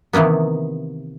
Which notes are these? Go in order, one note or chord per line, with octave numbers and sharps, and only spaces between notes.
C3 D#3 E3 A#3 B3